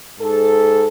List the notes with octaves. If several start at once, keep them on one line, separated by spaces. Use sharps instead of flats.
G#2 A4